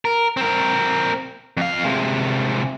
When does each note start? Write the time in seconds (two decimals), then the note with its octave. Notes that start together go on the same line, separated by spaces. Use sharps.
0.05 A#4
0.37 C4 A#4
1.57 F2 F5
1.85 C3 G#3